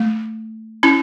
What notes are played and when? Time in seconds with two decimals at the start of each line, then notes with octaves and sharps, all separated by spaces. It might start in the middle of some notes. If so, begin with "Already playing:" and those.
Already playing: A3
0.83 C#4 E4